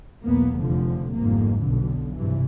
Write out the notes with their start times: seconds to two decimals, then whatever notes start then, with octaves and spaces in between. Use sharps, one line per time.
0.24 B1 E2 A#3 B3
0.59 F1 D3 F3
1.13 G1 F2 G#2 A#3
1.61 B1 B2 D3
2.17 G2 C3 E3